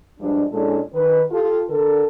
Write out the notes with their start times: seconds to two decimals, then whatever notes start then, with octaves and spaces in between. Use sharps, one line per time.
0.19 G2 F3 G#3 D4
0.52 A#2 G#3 C#4 D4 E4 A4
0.93 D#3 B4
1.31 F4 G4 A4
1.69 D3 A4 A#4